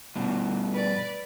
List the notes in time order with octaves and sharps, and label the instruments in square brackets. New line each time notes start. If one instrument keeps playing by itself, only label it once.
[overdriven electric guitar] G2 B2
[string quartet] B4 D5